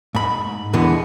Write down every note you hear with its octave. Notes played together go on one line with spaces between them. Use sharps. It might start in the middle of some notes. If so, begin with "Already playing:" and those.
G#2 B5
E2 B2 D3 E3 G#3 B3